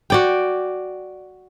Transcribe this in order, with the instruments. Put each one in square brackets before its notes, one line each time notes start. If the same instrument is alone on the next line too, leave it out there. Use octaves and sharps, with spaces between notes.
[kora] F#4 D5 G5